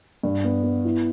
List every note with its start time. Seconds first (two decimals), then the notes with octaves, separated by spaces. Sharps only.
0.23 G2
0.44 B3
0.63 B3
0.84 E4